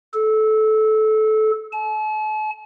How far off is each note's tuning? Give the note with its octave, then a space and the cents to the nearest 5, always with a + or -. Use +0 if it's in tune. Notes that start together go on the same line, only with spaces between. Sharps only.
A4 -20
A5 -45